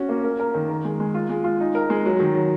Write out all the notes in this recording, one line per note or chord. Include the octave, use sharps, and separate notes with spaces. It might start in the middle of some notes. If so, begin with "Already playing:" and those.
Already playing: C#4 F#4
A#3
A#4
A#4
D#3
A#4
G#3
G#3
F4
G#3
F4
D#4
A#4
G#3
F#3
D#3
F#3